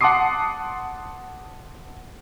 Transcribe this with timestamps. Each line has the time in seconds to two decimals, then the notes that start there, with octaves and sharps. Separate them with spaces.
0.01 F#5 A5 C6 D6 D#6 C7